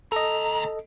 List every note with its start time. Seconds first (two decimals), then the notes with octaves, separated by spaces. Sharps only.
0.12 D2 A4 D#5 A#5